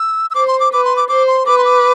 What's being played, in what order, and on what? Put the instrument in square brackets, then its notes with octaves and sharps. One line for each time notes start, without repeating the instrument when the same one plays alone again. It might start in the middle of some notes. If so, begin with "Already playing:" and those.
Already playing: [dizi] E6
E6
[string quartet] C5 [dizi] D6
[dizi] C6
D6
[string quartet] B4 [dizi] D6
[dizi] C6
D6
[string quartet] C5 [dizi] D6
[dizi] C6
[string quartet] B4 [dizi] D6
[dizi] C6
D6